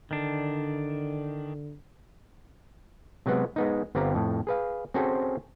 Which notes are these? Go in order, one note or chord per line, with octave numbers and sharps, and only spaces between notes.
D3 D#3 D4
C3 F#3 G#3 B3 F#5
G#3 B3 D#4
G1 B3 C4 G4 F5 A#5
F2 A2
G#4 B4 F5
C4 C#4 F#4 G#4 A4 C5